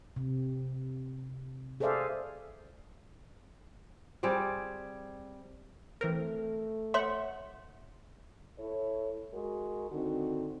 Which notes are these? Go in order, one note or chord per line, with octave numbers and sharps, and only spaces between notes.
C3
G#4 A4 C5 D5 E5 F5
G3 C4 G#4 D5
E3 A3 C4 A#4
C#5 E5 F#5 C6
E4 A4 C#5
G#3 F#4 A#4
D3 D#3 C4 D#4 F#4